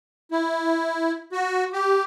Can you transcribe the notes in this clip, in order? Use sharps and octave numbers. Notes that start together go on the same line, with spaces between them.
E4
F#4
G4